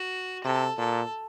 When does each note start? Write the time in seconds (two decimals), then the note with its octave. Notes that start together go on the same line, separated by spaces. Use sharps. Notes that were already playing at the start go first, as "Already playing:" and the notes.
Already playing: F#4
0.44 C3 A4
0.78 A#2 A4